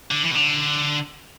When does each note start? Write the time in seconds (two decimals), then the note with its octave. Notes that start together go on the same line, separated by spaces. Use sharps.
0.11 D3
0.24 E3
0.32 B2
0.36 D3